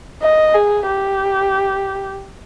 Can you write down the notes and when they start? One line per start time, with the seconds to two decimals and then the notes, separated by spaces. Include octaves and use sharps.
0.22 D#5
0.54 G#4
0.87 G4